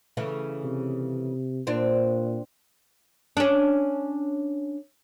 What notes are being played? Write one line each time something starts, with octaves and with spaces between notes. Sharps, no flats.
C#3 E3 A3
C3
A#2 C4 D4
C#4 D4